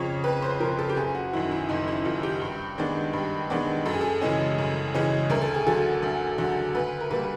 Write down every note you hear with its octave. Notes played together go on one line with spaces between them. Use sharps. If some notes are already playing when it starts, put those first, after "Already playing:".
Already playing: F2 C#3 F3 C#5
F2 B4
C5
C#3 F3 A#4
A4
G4
F#1 G#4
F#4
F#2 D#3 E4
E4
F#1 D#4
E4
F#2 D#3 F4
G4
G2
D#3 G#3 B3 D4
G2
D#3 G#3 B3 D4
F#2 A4
G#4
A4
C#3 E3 G#3 C#4
F#2
C#3 E3 G#3 C#4
D2 A#4
A4
G#4
D3 F#3 A4
D2
D3 F#3
D2 B4
A#4
D3 G3 A#3 B4